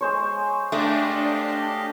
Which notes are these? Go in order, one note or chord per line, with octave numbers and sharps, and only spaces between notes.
G#3 C5 C#5
A3 D4 G4 D#5 F5